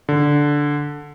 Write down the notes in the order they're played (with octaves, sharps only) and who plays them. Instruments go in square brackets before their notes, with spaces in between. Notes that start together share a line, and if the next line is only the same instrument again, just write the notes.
[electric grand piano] D3